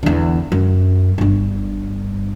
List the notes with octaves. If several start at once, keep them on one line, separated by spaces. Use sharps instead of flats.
E2 D3
F#2
G1 G2